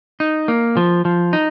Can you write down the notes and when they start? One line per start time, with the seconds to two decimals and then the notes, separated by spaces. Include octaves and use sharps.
0.20 D#4
0.48 A#3
0.77 F3
1.05 F3
1.33 D#4